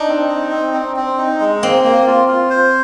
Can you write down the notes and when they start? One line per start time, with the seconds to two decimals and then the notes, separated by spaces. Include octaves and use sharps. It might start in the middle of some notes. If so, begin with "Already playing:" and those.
Already playing: D4 D#4
0.08 C4
0.29 D#4
0.51 C4
0.74 C4
0.96 C4
1.18 D#4
1.40 G#3
1.62 A#3 C4
1.84 A#3
2.07 F4
2.28 F4
2.50 C5